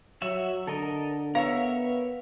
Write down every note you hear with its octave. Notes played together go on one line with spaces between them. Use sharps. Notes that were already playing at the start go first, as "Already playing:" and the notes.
F#3 F#4 C#5 E5
D3 A4 A#4 D#5
B3 A#4 C#5 E5 F5